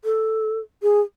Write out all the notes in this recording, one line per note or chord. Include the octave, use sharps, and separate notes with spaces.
A4
G#4